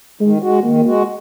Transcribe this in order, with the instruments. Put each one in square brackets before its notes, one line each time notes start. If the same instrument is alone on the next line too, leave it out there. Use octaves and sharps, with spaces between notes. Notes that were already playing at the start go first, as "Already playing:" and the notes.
[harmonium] D#3 [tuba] G#3
[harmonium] G#3 F#4
[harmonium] D#3 [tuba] A#3
[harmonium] G#3 F#4